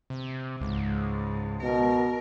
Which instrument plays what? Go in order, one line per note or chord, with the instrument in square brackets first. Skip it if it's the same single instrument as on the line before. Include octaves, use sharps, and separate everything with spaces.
[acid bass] C3
[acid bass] C#2 [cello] G#2
[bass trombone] B2 [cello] A#4